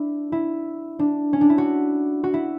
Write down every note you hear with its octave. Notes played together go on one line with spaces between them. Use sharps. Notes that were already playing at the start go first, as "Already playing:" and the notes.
Already playing: D4 E4
E4
D4
C#4
D4
E4
F#4
F#4
E4